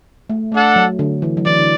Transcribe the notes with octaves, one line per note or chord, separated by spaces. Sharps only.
A3
A3 D4 A4 F#5
F#3
D3
E3
F#3
E3 D5
D3